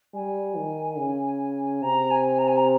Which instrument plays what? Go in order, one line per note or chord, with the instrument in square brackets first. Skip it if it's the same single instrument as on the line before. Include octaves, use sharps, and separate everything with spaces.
[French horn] G3 [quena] G#5
[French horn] D#3
C#3
[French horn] C3 [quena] A#5
[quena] G#5
A#5
G#5
A#5